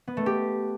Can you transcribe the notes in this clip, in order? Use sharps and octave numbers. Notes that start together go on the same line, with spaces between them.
B3
A3
G4